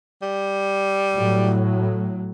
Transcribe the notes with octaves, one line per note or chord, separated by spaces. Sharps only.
G3
A2 F#3